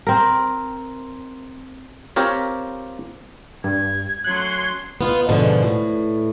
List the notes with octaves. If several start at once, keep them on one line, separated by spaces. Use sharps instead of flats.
C4 A#4
C4 F4 G4 A#4 C#5
G2 G#6
F#3 A3 C#4 C6 F#6
B3 D#4 F4
F2 G#2 B2 D3 F3
A2